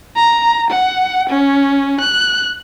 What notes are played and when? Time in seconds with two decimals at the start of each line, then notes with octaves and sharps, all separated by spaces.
0.16 A#5
0.70 F#5
1.29 C#4
2.00 F#6